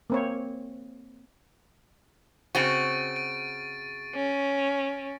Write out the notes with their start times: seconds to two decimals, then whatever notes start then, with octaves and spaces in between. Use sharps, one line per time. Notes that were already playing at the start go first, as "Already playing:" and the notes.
0.10 A#3 C4 C#5
2.55 C#3 C4 F#4 C#6 A6 D7
3.16 D7
4.15 C#4